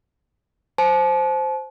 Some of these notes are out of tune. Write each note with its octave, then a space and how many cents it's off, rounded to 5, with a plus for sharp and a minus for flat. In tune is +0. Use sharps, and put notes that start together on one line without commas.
C5 +0 A5 -40